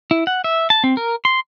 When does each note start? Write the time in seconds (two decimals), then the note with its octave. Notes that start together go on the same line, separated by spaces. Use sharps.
0.11 E4
0.27 F#5
0.44 E5
0.70 A5
0.84 C4
0.97 A#4
1.25 C6